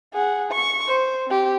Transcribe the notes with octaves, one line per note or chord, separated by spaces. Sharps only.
G#4 F#5
C#6
C5
C4 G4